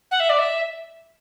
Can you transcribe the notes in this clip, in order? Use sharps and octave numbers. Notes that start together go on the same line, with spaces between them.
F#5
E5
D5
E5